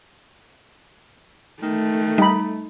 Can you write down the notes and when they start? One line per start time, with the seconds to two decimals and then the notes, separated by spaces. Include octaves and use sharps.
1.63 D#3 A3
2.18 G3 D#4 B5